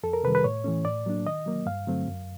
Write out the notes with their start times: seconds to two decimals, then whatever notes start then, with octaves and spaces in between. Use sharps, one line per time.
0.03 F2 A4
0.13 A#4
0.24 C3 D#3 G3 B4
0.35 B4
0.44 A2 C#5
0.64 E3 A3 C#4
0.85 A2 D5
1.06 F#3 A#3 D4
1.26 D#3 D#5
1.46 F#3 A#3
1.66 G2 F5
1.87 D3 F#3 A3 C4
2.07 F#2